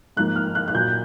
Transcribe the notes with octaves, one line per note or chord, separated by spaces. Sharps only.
G#2 F3 A#3 F#6
F6
F#6
F#6
A#2 F#3 A#3 G6